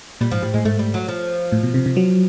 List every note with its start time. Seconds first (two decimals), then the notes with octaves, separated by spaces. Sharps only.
0.21 A#2 G3
0.31 G#2 F3
0.42 A2 G3
0.54 A2 G#3
0.65 G#2 A3
0.79 G3
0.94 F#3
1.08 F3
1.52 A2
1.63 B2
1.74 C3
1.86 C3
1.97 F#3